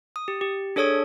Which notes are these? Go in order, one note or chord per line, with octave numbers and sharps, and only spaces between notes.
D#6
G4
G4
D4 G#4 A4 C#5 D#6 G#6